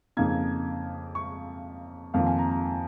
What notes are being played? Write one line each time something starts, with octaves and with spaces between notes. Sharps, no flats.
F2 C#3 A#3 D#4 G#6
C#6
F2 D#3 A#3 F4 F5
G#5
A#5
A#5